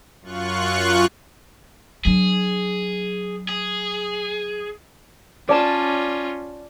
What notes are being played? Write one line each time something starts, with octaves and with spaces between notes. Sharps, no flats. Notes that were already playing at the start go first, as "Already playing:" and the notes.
F#2 F4 C#6 F#6
F#3 D4 G#4
G#4
C#4 F4 D5 A5 E7